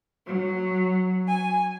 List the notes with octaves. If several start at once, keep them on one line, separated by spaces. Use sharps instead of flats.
F#3
G#5